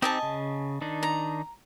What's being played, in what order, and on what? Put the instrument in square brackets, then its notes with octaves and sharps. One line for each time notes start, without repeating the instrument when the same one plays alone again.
[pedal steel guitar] C4 D#4 G4 [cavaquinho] D#5 G#5 A5
[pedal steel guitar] C#3
D#3 D4 D#4
[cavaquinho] A#5